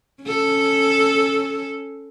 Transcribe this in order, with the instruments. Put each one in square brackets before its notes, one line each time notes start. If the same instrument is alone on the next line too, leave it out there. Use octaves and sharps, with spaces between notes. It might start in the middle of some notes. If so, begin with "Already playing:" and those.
[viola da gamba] C#4 A4